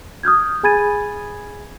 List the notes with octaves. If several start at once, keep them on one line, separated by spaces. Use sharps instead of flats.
D#6 F6 G6 G#6
G#4 G#5 B5 G#6 A6 D#7